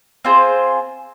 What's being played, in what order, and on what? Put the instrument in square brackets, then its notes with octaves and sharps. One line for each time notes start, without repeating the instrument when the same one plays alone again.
[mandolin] C4 F4 G#4 C5